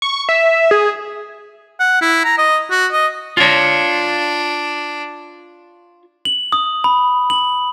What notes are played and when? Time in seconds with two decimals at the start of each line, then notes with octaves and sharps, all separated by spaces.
0.02 C#6
0.29 E5
0.71 G#4
1.80 F#5
2.01 E4
2.24 A#5
2.38 D#5
2.70 F#4
2.92 D#5
3.37 D4 F4 C#5
6.25 F#7
6.52 D#6
6.84 B5
7.30 F#7